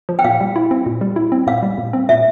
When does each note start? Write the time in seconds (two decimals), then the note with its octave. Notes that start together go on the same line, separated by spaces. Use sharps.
0.09 F3
0.19 G5
0.24 A#2 F5
0.41 G3
0.56 E4
0.71 C4
0.86 A#2
1.01 G3
1.16 E4
1.32 C4
1.47 A#2 F5
1.63 G3
1.78 A#2
1.93 C4
2.09 A#2 E5